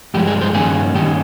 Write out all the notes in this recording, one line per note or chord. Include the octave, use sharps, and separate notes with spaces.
G2 F3 G#3 G4
G#4
C5
G2 D#3 A#3 C#4 G#4
G2 D#3 A#3 C#4 G4